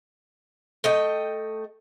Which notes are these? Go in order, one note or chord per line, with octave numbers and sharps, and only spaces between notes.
A3 D#5 G5